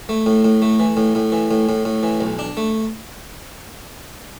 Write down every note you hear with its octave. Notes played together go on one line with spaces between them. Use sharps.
A3
A2
A2
A3
E3
A2
A2
E3
A2
A2
A2
E3
B1
D4
A3